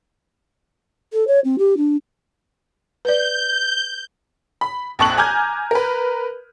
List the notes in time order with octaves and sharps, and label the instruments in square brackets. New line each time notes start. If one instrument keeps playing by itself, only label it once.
[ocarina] A4
C#5
C4
G4
D4
[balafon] B4 D5 [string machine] G6
[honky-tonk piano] B5
A#1 F2 A5 C#6 F#6 F#7
G#5 A#5 D6 F6 G6 G#6
A#4 B4